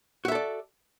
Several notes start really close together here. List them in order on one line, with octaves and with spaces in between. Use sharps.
F#4 E5 A4 D5